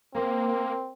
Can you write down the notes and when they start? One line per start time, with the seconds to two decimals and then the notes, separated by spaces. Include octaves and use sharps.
0.15 A#3 C4 A#4 C5